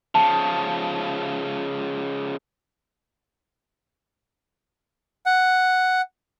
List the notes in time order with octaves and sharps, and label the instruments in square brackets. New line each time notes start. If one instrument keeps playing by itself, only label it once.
[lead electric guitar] C#3 F3 [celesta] A5
[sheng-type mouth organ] F#5